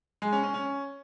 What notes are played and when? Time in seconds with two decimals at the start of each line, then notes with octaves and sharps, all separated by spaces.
0.22 G#3
0.33 C#4
0.43 C#4
0.54 C#4